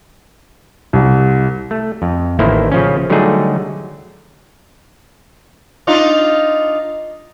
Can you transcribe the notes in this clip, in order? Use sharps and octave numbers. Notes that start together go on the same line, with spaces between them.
C2
A3
F2
A1 D#3 A3 A#3 E4 C5
C#3 F3 C#4
D3 F#3 G3 A3 D#4 G#4
D4 D#4 F4